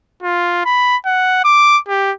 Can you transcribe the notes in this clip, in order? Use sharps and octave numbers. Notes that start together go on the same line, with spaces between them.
F4
B5
F#5
D6
G4